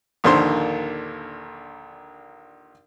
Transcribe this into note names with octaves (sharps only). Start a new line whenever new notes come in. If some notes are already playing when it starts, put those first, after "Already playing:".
A#1 D#2 D3 C5 C6